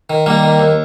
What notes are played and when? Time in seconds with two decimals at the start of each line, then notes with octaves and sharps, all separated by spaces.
0.10 D#3
0.26 D#3 G3 A#3
0.43 D#3
0.59 D#2